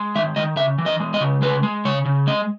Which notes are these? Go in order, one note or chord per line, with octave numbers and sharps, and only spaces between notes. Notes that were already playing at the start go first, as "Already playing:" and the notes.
Already playing: G#3
D#3 E5
D#3 D#5
C#3 E5
E3
D#5
G#3
D#5
C#3
G#3 B4
G#3
C#3 C#5
C#3
G#3 D#5